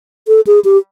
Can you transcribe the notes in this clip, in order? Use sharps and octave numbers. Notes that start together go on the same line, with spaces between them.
A4
G#4
G4